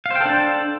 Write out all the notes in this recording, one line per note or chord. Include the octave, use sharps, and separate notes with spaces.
D4 A4 C5 F5 G5